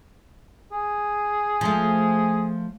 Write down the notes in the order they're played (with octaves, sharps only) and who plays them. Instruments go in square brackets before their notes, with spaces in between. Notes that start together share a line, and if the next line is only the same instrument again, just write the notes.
[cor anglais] G#4
[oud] F3 A3